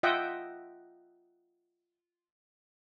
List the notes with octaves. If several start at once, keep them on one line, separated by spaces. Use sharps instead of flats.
F4 D#5 E5 F#5 G5